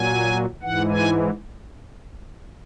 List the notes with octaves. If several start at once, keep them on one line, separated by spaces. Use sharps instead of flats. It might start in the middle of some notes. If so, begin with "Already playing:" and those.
Already playing: A#2 F#3 G#5
G#2 E3 F#5
G#5